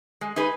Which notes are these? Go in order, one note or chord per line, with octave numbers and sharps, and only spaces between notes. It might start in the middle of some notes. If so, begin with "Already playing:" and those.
G#3
D#4 G#4 B4